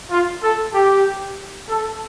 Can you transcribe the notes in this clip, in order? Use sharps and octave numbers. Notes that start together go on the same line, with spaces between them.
F4
A4
G4
A4